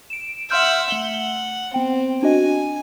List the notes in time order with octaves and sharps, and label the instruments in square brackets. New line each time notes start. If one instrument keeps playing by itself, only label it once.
[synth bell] D7 E7
[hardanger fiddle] E5 F#5 [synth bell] C6 F6 G6
[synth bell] A3 G7 [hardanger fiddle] F#5
[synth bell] B3 G5 [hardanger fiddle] C4
[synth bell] D4 F#4 D#5 [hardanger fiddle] G#5